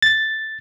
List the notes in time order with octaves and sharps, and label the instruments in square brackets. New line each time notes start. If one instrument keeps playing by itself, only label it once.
[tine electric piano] A6